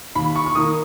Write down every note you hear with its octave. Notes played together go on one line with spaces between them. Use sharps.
D#2 B5
C#6
C#6
D#3 A#3 D#6